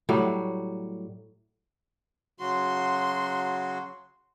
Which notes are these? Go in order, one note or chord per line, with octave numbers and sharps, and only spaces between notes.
A2 F#3 G3
C#3 F#3 F#4 C6